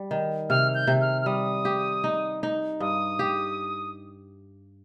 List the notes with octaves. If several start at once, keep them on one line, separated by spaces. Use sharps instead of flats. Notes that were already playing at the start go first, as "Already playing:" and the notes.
Already playing: G3
D#3
C3 F6
G6
C3
F6
F6
G3 D#6
G4
D#4
D#4
G2 D#6
G4